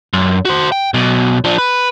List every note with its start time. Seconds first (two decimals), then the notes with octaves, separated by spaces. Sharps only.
0.13 F#2
0.45 F#4 C5
0.72 G5
0.94 B1 B2
1.44 F3 D4
1.58 B4